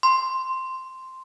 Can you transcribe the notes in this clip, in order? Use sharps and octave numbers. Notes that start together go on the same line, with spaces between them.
C6